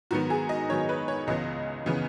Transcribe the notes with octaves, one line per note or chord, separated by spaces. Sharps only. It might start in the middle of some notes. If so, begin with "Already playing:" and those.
G#2 D#3 F#3 B3 F#4
G#4
D#5
G#2 D#3 F#3 B3 C#5
B4
C#5
C#2 C#3 E3 B3 D#5
C#3 E3 B3